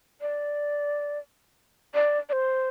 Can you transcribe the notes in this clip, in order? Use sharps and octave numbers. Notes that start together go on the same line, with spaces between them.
D5
D5
D5
C5